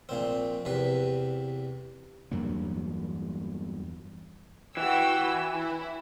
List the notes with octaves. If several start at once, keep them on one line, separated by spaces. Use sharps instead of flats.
A#1 A#2 C4
E2 C3 B4
E2 G2 F#3 A#3
E3 F#4 G5 E6
E4